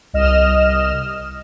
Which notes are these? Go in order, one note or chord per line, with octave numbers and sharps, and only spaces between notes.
C2 D#5 F6 E7